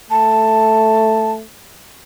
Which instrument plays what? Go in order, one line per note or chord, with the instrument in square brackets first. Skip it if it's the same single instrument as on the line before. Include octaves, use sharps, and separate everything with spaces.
[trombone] A3 [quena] A5